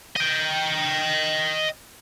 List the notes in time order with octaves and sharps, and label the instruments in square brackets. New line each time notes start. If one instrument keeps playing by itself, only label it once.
[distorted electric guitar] D#5 G5